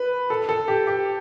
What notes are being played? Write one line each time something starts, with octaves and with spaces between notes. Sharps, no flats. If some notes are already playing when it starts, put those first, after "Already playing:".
Already playing: B4
A4
A4
G4
G4